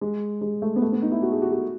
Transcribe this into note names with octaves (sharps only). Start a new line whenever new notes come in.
G#3
G#3
A3
B3
A3
B3
D#4
E4
F#4
G#4
F#4
F#4